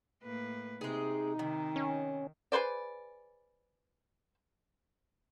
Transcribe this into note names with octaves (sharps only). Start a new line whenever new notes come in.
A2 A#3 B4
C3 G#3 D#4 G#4
C3 D#3
C#4
G#4 B4 C5 D5